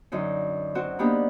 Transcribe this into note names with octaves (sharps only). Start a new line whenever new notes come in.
F#2 D3 D#4
C4 F#4
A#3 B3 D4 D#4 G4